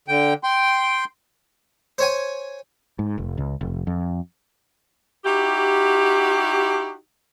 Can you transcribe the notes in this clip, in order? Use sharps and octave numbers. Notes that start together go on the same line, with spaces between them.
D3 G5
G5 C6
C5 C#5 G#5
G#2
F1
C#2
F1
F2
D#4 E4 F#4 G4